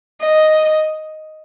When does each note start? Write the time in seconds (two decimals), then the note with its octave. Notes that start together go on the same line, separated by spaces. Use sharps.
0.21 D#5